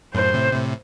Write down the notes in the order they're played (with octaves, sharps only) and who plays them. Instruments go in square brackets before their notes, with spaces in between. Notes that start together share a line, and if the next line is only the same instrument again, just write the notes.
[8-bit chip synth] F#2 A2 [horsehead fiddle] C5
[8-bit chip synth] A2 C3
A2 C3